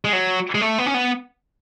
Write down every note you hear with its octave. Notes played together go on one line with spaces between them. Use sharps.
G#3
F#3
G#3
A3
B3
C#4
B3